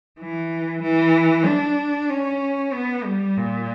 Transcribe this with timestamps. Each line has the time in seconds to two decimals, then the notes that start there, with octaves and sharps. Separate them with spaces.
0.20 E3
0.83 E3
1.46 D4
2.10 C#4
2.73 B3
3.04 G3
3.37 A#2